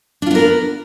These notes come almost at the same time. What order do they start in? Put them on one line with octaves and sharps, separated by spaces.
D4 F4 B3 A#4